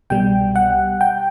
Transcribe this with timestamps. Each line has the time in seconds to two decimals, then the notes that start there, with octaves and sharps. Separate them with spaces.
0.10 C2 B2 G3 G5
0.56 F#5
1.01 G5